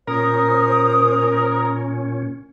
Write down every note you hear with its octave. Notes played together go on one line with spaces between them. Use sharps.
A#2 C#4 A#4 C5 D#6